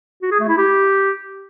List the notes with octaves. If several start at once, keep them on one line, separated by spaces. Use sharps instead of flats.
F#4
G#4
A3
E4
G4